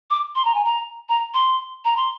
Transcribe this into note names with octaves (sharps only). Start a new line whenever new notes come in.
D6
C6
A#5
G#5
A#5
A#5
C6
A#5
C6